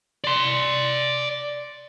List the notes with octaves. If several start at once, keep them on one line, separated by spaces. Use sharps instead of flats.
D5 C6